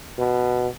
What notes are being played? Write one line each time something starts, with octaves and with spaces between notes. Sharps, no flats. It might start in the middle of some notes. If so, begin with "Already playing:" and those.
B2